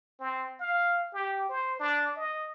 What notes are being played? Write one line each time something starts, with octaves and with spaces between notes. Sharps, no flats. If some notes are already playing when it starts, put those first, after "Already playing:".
C4
F5
G4
C5
D4
D#5